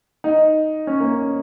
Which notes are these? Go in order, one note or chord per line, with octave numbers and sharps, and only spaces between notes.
D#4
C#4
A#3
C#4